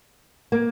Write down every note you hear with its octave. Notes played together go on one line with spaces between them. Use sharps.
A#3